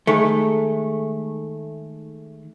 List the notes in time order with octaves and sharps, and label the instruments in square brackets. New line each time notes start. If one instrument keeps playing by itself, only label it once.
[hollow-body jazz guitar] D#3 G#3 A3